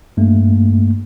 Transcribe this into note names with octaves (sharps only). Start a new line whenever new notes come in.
G2 A3 A#3